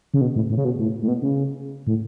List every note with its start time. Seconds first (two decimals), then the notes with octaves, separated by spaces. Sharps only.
0.14 C#3
0.21 B2
0.36 A2
0.50 A2
0.57 C#3
0.65 B2
0.79 A2
1.02 A2
1.08 B2
1.22 C#3
1.87 A2